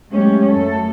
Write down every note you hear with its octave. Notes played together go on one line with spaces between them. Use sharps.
F#3 G#3 A3 C#4 G4
F#2 A3 A4